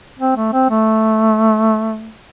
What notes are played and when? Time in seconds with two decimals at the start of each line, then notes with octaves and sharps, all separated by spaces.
0.19 C4
0.37 A3
0.53 C4
0.70 A3